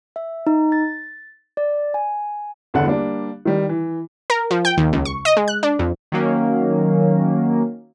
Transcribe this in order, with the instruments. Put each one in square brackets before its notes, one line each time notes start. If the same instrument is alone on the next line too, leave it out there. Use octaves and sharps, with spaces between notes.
[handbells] E5
D#4
A6
D5
G#5
[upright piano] G1 E2 D3 F#5
G3 A#3 D4
D#3 G3
E3
[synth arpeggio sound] A#4
F3
G5
D#2
C#2
C#6
D#5
G#3
F#6
D4
F2
[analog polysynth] D#3 F#3 A#3 C#4